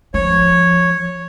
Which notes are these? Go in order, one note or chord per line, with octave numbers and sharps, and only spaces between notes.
F3 C#5